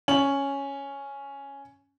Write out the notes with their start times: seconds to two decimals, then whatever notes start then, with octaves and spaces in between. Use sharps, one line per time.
0.08 C#4 F#7